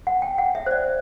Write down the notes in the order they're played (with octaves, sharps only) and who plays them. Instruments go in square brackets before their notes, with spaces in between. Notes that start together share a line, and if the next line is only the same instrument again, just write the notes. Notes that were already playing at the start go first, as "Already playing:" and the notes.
[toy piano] F#5
G5
F#5
E5
C5
D5